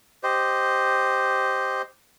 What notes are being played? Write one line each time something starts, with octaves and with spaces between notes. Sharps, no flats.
G4 C5 D#5